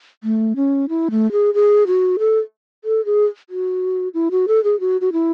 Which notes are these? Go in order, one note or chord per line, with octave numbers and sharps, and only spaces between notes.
A3
C#4
E4
A3
G#4
G#4
F#4
A4
A4
G#4
F#4
E4
F#4
A4
G#4
F#4
F#4
E4